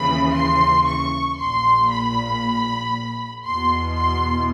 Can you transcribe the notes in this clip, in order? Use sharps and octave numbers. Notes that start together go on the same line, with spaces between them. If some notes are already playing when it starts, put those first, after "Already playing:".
Already playing: D#2 C#3 E3 B5
C6
C#6
A#1 A#2 C6
B5
E2 B2 C6
C6